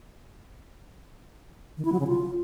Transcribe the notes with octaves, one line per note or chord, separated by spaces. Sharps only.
D#3
E4
F#3
C#3
F4